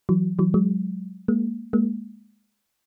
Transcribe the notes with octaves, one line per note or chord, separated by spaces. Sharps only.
E3 F#3
E3 F#3
F#3 G#3
G#3 A#3
G#3 A#3